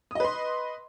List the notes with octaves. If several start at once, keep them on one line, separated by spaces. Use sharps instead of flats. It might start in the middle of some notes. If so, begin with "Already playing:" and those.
B4 D#5 C6 D#6